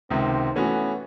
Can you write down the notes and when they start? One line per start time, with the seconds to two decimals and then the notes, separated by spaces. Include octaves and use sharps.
0.10 C#2 C3 D#3 C4
0.55 E3 A3 B3 C#4 F#4